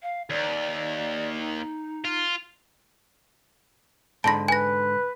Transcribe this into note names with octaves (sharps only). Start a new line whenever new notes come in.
F5
D#2 D5
D#4
F4
G#2 D3 A5 B5 A#6
B4 G#5 A#6